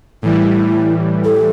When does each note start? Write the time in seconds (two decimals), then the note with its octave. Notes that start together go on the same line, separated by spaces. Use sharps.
0.22 A2 E3 G3 E4
1.24 A4